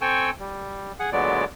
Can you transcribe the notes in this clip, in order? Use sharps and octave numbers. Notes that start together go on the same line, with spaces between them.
C4 A4 G5 G#5 C#6 E6
G3
G#4 F#5
A#2 D3 F#3 G#3 B3 D5